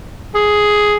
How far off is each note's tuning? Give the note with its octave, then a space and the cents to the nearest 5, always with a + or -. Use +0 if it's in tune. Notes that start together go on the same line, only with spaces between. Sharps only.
G#4 +5